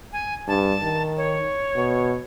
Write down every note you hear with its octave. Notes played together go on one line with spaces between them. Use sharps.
G#5
G2 A5
D#3
C#5
B2